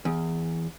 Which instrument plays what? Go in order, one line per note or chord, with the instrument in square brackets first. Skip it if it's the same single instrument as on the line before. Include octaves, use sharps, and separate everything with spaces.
[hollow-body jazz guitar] E2